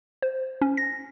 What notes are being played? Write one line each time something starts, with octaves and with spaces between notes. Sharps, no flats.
C5
C#4
A#6